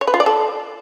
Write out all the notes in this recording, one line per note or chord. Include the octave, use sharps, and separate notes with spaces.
C#5
B4
F4
D5
A4